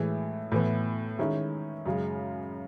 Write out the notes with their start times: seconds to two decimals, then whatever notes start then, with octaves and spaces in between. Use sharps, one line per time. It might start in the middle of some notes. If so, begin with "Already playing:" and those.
Already playing: A2 E3 G#3
0.52 A2 E3 B3
1.19 D#3 G#3 C#4 E4
1.86 F#2 C#3 G#3